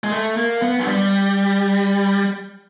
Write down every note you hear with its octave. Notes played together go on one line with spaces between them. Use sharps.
G#3
A3
A#3
B3
F#3
G3